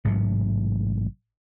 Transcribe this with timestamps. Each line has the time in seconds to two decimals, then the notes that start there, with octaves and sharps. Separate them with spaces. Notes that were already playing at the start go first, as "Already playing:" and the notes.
0.05 A1 G#2 C3 F#3